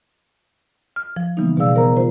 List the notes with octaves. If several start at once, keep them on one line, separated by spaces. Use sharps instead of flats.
F6
F3
C#3 E3 G3 A#3 B3 D#4
B2 G3 G#4 D5 F5 E6
B3 A#4 C5 A#5
F4 C5